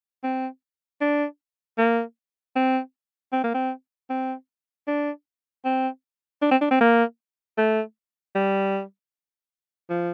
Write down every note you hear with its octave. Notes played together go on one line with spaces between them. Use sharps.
C4
D4
A#3
C4
C4
A#3
C4
C4
D4
C4
D4
C4
D4
C4
A#3
A3
G3
F3